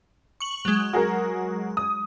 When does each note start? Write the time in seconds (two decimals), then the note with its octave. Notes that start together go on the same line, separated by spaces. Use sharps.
0.40 C#6 F#7
0.65 F#3 G#3
0.93 F#4 G#4 A#4
1.77 D#6